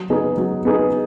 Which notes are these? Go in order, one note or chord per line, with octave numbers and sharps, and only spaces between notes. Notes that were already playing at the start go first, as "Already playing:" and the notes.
Already playing: F#3
B3 D#4 G#4
F#3
B3 D#4 G#4